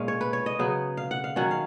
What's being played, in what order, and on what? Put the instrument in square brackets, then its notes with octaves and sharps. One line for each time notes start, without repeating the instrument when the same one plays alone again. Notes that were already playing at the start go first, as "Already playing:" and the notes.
Already playing: [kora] A#2 G#3 C#4 F5
C#5
B4
C#5
D#5
C#3 F#3 B3
F5
F#5
F5
D#3 F#3 C#4 F#5
F5